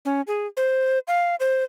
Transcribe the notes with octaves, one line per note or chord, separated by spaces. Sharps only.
C#4
G#4
C5
F5
C5